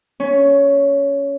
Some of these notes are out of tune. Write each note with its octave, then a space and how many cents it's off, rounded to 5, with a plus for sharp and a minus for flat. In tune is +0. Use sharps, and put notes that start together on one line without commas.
C#4 +15 C#6 +0